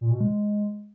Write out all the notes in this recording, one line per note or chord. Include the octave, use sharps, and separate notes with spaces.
A#2
B2
G#3